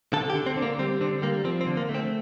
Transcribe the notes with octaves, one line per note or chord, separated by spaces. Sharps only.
D3 A4
G4
D3
C4
D3
A#3
G3 C4
D3 C4
G3 A#3
F3 C4
C4
D3
A#3
A3
C4